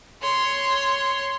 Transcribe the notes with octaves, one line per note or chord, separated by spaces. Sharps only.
C#5 C6